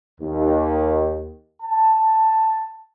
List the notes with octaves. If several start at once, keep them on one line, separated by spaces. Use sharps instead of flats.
D#2
A5